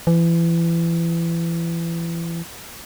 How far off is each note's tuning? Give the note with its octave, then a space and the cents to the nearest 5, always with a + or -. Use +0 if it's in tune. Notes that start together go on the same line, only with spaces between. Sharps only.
E3 +30